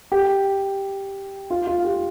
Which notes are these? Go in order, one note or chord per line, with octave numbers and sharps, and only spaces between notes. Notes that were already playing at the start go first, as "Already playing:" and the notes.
G4
F4
F4
G4